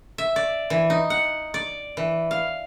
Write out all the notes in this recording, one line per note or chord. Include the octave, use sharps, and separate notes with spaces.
E5
D5
E3
D#4
F#5
D5
E3
F5